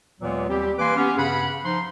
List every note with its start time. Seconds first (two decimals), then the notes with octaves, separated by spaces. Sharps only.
0.21 D#2 A#2 E3 F#3 G#3 B3
0.49 D#2 G3 C4 G4
0.78 E3 A#3 B4 G#5 C6 D6
0.96 B3 C#4 G4
1.17 G2 C#3 G#4 F#5 B5
1.65 F3 D#4 C6